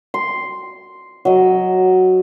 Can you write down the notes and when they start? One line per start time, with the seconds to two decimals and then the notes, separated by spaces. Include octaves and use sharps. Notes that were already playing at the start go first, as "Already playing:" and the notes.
0.14 C6
1.25 F#3 D#5